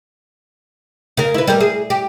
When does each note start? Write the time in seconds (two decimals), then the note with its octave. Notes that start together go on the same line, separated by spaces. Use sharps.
1.17 C#3 A#4
1.34 E4 B4
1.48 G3 A#4
1.60 G#4
1.90 G4